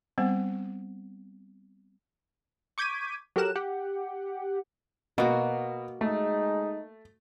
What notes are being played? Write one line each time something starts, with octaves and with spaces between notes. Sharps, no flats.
G3 B3 C4 C5 F#5
C#6 D6 G6 G#6 B6 D#7
F#3 G4 A4 A#4 F#6 E7
G4 F#5
B2 A#3 F#4
G#3 A3 D#4